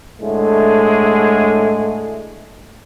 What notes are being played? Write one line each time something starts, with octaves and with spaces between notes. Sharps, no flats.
A2 D3 G#3 A3